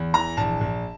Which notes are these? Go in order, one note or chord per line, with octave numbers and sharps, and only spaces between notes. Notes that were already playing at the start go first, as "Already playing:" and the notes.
Already playing: E2
E3 A#5
A#1 A5
A#1